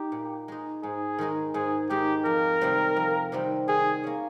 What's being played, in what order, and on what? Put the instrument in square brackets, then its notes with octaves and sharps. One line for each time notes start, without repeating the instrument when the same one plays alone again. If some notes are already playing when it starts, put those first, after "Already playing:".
Already playing: [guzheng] D#4 [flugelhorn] G4
[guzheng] A#2
G#3 D#4
[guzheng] G#2 [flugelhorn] G#4
[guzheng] D#3 G#3 D#4
[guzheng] G#2 [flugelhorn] G#4
[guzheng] D#3 G#3 D#4 [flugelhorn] G4
[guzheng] F2 [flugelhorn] A#4
[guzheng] C3 D#3 G3 C4
F2
C3 D#3 G3 C4
[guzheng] D#3 [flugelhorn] G#4
[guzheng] A#3 C#4